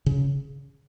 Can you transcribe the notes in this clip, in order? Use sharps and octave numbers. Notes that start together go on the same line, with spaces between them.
C#3